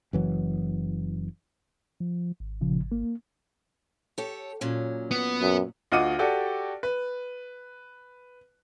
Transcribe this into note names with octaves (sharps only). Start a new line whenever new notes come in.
F#1 E3 F#3
F3
G#1
A#2 C#3 F3
A#3
G4 A4 C#5
A#2 F#3 C#4
B3
F#2
D2 F4 D#5 F#5 D6 D#7
F#4 G4 A4 D5
B4